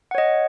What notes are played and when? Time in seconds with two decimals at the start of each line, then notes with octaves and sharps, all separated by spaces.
0.11 F#5
0.15 C#5
0.18 D#5